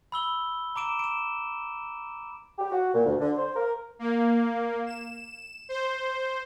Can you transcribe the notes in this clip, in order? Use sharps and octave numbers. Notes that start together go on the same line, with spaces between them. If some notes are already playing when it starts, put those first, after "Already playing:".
B5 E6 G7
A#5 D6 D7 E7
D7 E7
G4
F#4
A#2
D2
D3
C5
A#4
A#3
E7
C5